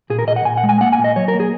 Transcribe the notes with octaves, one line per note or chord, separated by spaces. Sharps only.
A#2 G#4
A#4
A#2 D#5
F#5
A#2 G#5
F#5
G#3
G#5
A#3 F#5
G#5
A#2
D#5
F#3 C#5
A#4
A#3
G#4